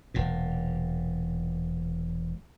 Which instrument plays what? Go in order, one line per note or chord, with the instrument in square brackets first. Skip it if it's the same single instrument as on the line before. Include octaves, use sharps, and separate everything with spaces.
[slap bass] E1 A#2